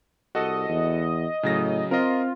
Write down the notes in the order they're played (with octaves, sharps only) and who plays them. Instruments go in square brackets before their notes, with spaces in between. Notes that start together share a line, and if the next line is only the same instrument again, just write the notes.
[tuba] C2 [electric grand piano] F#4 A4 [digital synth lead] D#5
[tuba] E2
[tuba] A2 [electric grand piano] C#3 F#3 A#6
[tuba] C4 [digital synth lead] F4 [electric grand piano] A#4 D#5